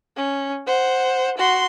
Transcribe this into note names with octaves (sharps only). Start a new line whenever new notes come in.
C#4
C5 F#5
F#4 C6